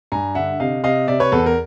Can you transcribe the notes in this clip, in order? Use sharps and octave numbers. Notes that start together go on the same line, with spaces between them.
G2 G#5 A#5
D3 E5 F#5
C3 D#5 F5
C3 D#5 F5
C3 D5 E5
B4 C#5
E2 A4 B4
A#4